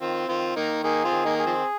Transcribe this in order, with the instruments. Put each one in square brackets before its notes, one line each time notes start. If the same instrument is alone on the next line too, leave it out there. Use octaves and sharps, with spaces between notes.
[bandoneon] D#3 [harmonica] C4 F4
[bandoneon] D#3 [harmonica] C4 F4
[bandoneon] D#3 [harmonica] A#3 D#4
[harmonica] A#3 D#4 [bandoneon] G#4
[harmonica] C4 F4
[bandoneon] D#3
[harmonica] A#3 D#4
[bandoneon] G#4
[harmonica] F3 C4